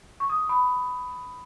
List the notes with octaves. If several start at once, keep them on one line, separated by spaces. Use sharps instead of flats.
C#6
D#6
B5